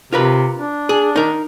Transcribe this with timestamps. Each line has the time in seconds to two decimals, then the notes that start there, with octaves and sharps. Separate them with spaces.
0.13 C3 F4 A#4 B4
0.58 D4
0.89 G#4
1.16 D#4 A#4